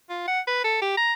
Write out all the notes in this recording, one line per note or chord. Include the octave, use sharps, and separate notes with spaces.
F4
F#5
B4
A4
G4
A#5